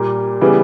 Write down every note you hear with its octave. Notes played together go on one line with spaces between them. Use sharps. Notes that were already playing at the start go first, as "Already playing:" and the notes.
Already playing: A#2 G3 A#3
C#3 E3 G3 B3